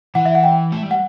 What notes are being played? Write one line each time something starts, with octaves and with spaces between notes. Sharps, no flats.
E3 F#5
E5
F#5
G5
A3
G3
F#5